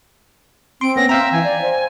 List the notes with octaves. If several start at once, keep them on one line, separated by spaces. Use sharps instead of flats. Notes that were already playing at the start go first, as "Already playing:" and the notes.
C4 C6 D7
A#3 B3 C#4 A#6
E5 F5 G5 A#5
E3 G#5
D5
C5